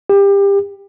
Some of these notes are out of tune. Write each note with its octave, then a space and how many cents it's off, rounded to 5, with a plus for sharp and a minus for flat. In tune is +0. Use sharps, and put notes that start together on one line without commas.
G4 +25